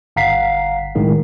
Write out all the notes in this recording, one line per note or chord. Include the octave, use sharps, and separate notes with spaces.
G1 F5 F#5 A#5 B6 C7
B1 A2 D#3 G#3